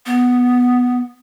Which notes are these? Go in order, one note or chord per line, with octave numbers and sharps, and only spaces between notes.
B3